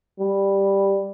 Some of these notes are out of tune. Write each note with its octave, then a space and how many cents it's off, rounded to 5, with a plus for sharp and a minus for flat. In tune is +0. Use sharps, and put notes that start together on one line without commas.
G3 +5